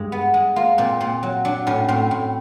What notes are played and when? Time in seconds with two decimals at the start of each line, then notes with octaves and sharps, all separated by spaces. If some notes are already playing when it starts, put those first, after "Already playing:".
Already playing: G2 G#3
0.12 B3
0.34 G#3
0.56 A#3 F4
0.78 A#2 C4
1.01 A#2 C4
1.23 F#3
1.45 F#3 D4
1.67 A2 C#4
1.88 A2 C4
2.11 A2